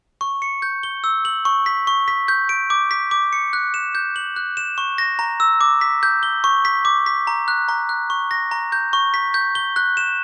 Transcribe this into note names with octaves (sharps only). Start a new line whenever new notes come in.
C#6
C#7
G6
G7
E6
F#7
C#6
B6
C#6
B6
G6
D7
D6
B6
D6
C#7
F#6
E7
G6
F#7
F#6
E7
C#6
A#6
A#5
E6
D6
B6
G6
G7
C#6
B6
D6
B6
A#5
F#6
A#5
F#6
C#6
A#6
A#5
G6
C#6
B6
G6
G7
F#6
E7